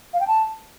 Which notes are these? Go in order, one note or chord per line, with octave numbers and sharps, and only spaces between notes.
F5
G5
A5